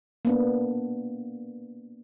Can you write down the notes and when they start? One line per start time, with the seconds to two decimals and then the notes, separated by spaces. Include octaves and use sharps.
0.25 A#3 B3 D4